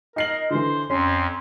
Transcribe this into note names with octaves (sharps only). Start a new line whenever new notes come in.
D#4 A#4 C7 F#7
D3 E3 C5
F2 C#4 C6